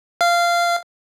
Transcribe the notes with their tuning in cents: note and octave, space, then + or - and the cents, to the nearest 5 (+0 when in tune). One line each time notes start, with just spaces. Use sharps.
F5 -15